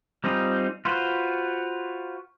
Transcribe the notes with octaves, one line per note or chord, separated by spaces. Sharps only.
G3 C4 D#4 F4 G#4
F4 F#4 B4 C5